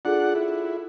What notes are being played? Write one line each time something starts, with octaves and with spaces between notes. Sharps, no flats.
D4 F4 G#4 A4 F#5
E4